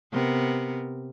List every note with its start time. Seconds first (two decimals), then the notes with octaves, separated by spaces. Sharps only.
0.12 C3 B3 A#4